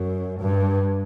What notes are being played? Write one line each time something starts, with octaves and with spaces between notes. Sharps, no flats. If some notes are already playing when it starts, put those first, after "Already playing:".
Already playing: F#2
G2